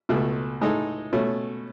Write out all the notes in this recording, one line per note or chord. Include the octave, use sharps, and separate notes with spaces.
C#2 B2 A3
A2 G#3 D#4 A4
B2 A3 C#4